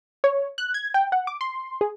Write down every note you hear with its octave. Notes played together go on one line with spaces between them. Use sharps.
C#5
F#6
G#6
G5
F#5
D6
C6
G#4